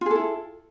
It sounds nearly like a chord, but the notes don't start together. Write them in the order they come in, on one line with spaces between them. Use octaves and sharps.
F4 G#4 A4 E4